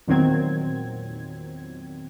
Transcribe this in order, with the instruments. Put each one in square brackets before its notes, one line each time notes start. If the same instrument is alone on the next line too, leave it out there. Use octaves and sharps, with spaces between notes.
[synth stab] E2 A#2 D#3 F#3 C4 G#6